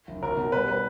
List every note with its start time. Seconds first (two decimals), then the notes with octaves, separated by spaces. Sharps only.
0.08 F#1
0.23 B1 A#4
0.37 B2
0.52 G3 B4
0.68 B4